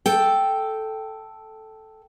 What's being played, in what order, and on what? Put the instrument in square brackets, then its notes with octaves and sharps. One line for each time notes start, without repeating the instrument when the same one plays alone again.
[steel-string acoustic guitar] A4 G5